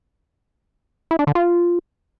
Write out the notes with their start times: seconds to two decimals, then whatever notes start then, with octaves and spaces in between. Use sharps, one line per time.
1.11 E4
1.19 D4
1.27 D3
1.35 F4